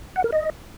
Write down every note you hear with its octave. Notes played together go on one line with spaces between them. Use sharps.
F#5
A#4
D#5